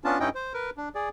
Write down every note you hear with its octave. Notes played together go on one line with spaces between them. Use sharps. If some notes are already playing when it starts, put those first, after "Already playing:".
B3 C#4 D4 F4 A5
G2 C#4 D#4 E4 D#5 G5
C5
A#4 B4
D4
G#4 D5